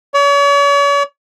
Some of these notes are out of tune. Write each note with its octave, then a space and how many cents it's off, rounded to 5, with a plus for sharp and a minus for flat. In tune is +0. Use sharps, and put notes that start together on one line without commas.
C#5 +40